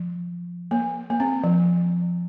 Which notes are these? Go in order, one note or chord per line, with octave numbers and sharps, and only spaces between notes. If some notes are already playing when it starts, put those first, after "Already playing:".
Already playing: F3
A#3
A#3
C4
F3